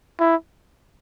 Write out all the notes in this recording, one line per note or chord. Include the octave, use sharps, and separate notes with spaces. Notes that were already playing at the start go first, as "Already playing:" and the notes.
E4